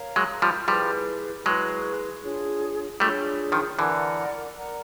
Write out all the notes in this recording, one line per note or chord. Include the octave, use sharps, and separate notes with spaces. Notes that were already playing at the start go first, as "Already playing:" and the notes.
Already playing: A#4 C#5 F5 A#5
F#3 G#3
F3 G3
F3 G3 E4 G#4 B4
F#3 G#3 E4 G#4 B4
D4 F4 G#4 C#5
G3 A3 D4 F4 G#4 C#5
D#3 F3
D3 E3 A#4 D5 F#5 A#5
A#4 D5 F#5 A#5